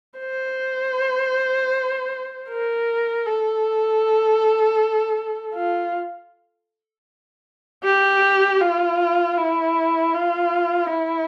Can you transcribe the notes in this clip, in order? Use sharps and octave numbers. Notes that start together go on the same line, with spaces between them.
C5
A#4
A4
F4
G4
F4
E4
F4
E4